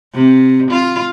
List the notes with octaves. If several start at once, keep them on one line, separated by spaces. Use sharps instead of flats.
C3
F4